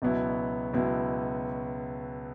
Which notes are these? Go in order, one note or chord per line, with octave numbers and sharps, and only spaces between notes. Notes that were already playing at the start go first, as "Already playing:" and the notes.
C#2 B2 F#3 B3 E4
C#2 B2 F#3 B3 E4